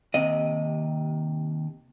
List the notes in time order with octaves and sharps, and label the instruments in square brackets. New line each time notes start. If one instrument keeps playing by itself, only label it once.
[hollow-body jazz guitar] D#2 C3 D#5